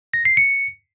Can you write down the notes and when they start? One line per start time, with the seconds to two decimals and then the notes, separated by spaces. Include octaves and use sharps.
0.14 A#6
0.25 C7
0.37 C#7